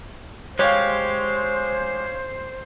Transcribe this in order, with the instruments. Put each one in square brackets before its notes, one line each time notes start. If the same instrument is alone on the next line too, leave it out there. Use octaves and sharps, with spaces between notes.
[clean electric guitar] G#3 G4 [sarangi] C5 [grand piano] C#5 F5